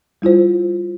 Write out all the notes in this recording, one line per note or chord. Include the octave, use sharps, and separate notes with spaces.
G3 E4 F4 C5